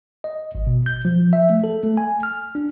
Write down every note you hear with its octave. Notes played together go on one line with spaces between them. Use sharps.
D#5
G#1
B2
G6
F3
E5
A3
A4
A3
G#5
F6
D4